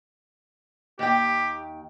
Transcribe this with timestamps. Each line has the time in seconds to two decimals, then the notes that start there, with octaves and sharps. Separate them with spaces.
0.99 D#2 G4 G5